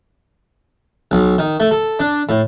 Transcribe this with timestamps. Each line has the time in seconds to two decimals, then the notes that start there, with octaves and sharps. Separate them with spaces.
1.11 B1
1.38 D#3
1.60 A3
1.71 A4
1.99 D4
2.29 A2